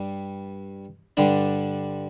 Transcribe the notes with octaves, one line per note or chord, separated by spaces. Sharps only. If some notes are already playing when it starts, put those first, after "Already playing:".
Already playing: G2 G3
G2 D3 G3 D4